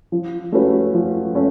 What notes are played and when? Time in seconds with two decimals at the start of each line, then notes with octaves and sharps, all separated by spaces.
0.12 F3
0.52 A3 C#4 F#4 B4
0.94 F3
1.35 A3 C#4